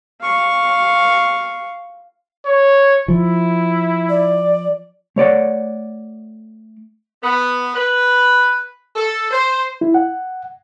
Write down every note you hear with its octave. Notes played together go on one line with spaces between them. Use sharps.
F5 C#6
C#5
F3 E4
D5
A3 C#5 D5 F#5
B3
B4
A4
C5
E4
F#5